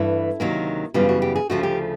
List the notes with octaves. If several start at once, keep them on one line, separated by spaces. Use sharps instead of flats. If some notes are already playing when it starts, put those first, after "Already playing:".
Already playing: G2 E3 A3 E4
D2 C3 D#3 F#3 A#3
F#2 C#3 E3 G3 B3 F4
F#4
G4
G#4
D2 C#3 F3 A3 F#4
G4